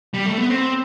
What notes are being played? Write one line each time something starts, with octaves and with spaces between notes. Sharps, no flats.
G3
A3
B3
C4